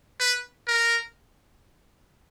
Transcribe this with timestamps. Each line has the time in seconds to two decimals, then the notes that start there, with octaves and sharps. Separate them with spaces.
0.20 B4
0.68 A#4